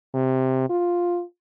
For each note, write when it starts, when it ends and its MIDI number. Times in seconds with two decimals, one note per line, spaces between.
0.14 0.65 48
0.70 1.23 65